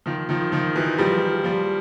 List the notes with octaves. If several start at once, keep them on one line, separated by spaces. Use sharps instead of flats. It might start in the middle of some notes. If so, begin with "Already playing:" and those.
D#3 F3
D#3 F3
D#3 F3
E3 F#3
F3 G3
F3 G3